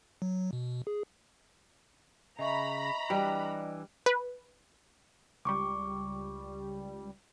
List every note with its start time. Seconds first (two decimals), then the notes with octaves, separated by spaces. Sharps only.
0.22 F#3
0.53 B2
0.87 G#4
2.39 C#3 D#5 E5 A#5 B5 C#6
3.10 E3 G3 D4 D5 D#5 D6
4.06 B4
5.45 C#2 G3 C#6 D6